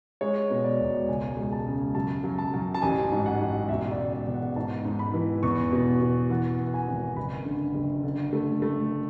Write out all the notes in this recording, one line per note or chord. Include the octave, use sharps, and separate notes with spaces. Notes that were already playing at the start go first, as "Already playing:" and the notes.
G#3 C#5
B2
D5
E1
C#2 G#5
G#3
A5
C#3
F#2 A5
F#2
A5
F#2
A5
A1 G#5
G#2
F#5
A1
E1 E5
D5
C#3
D5
E2
F#5
G#2 A5
G#2
B5
E3
E2 C#6
B2
B2
E3 F#5
B3
F#5
G#5
G#1
F#1 B5
D3
F#1
D3
A3
A3